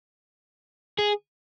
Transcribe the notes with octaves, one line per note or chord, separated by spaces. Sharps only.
G#4